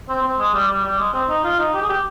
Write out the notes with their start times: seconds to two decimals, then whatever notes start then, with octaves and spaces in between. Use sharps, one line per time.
0.09 C4
0.23 C4
0.39 G#3
0.53 G3
0.68 G3
0.84 G3
0.99 G#3
1.14 C4
1.29 D#4
1.44 F4
1.59 D#4
1.74 G4
1.82 G#4
1.89 G4